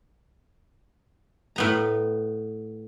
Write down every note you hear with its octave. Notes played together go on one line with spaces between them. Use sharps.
A2 B3 A#5